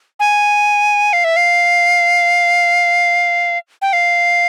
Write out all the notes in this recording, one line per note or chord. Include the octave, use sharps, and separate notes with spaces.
G#5
F5
E5
F5
G5
F5